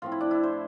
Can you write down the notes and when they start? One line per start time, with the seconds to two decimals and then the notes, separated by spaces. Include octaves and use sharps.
0.02 A2 F3 C4 F4
0.12 E4
0.21 D4
0.31 E4
0.43 C5